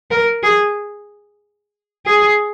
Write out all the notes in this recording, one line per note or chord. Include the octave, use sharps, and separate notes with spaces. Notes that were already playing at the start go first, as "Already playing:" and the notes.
A#4
G#4
G#4